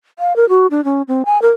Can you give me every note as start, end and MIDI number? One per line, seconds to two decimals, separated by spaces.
0.19 0.36 77
0.36 0.48 70
0.49 0.67 66
0.71 0.84 62
0.84 1.02 61
1.08 1.23 60
1.26 1.41 80
1.42 1.51 70